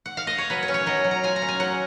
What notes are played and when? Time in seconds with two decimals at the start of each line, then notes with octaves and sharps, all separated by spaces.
0.06 F#5
0.17 F5
0.27 D#5
0.38 C#5
0.50 F#3 B4
0.63 C#5
0.68 C#4
0.74 C#5
0.86 F#3 D#5
1.04 F#3
1.11 A#5
1.24 F4 G#5
1.36 A#5
1.42 C#4
1.49 G#5
1.60 F#3 F#5